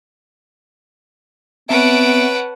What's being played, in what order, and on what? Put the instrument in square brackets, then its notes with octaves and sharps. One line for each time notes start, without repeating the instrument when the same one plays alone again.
[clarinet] B3 [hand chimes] C4 E5 [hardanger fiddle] B4 A5 [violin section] C#5 F#5 D7